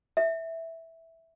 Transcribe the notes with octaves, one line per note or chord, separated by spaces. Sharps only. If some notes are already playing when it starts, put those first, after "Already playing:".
E5